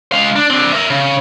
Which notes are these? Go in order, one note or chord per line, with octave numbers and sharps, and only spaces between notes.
G#3 F5
D4
C4 D4
A#4 E5
C#3